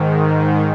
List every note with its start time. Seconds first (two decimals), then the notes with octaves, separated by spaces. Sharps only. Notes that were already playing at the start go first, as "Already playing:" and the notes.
Already playing: G#2 D#3